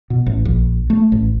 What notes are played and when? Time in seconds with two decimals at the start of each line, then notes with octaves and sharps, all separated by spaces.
0.10 B2
0.26 A1
0.45 A#1
0.90 A3
1.12 A1